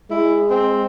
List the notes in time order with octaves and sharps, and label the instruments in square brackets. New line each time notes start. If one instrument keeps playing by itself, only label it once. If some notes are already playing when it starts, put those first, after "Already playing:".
[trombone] G#3 [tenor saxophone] E4
[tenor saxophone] C4